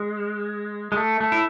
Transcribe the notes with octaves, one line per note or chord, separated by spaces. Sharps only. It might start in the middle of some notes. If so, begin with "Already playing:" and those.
Already playing: G#3
G#3
A3
A3
E4